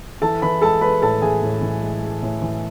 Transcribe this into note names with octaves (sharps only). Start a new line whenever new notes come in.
E3 A4 A5
E3 B4 B5
G#3 A4 A5
G#3 B4 B5
A2 A4 A5
E3 G#4 G#5
A2
E3
G#3
G#3
A2
E3